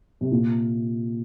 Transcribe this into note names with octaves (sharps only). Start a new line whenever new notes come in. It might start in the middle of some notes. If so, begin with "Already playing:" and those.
C3
A#2